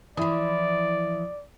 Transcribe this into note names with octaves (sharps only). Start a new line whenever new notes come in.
E3 F3 E4 D5 D#6